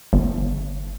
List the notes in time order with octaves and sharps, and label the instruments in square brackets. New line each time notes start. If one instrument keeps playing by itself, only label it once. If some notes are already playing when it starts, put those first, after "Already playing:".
[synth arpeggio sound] G1